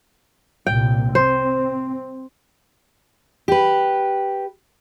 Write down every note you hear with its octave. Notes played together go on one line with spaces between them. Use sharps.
C2 A#2 G5
C4 C5
G4 B4